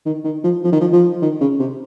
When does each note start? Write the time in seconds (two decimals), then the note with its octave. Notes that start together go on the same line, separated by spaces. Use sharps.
0.06 D#3
0.24 D#3
0.44 F3
0.64 F3
0.72 D#3
0.80 F3
0.92 F3
1.22 D#3
1.41 C#3
1.59 C3